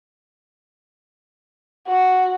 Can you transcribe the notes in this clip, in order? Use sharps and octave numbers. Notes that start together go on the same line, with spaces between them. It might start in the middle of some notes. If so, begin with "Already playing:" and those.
F#4